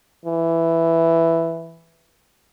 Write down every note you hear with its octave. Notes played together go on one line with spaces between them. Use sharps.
E3